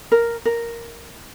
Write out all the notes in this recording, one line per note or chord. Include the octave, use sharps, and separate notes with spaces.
A#4
A#4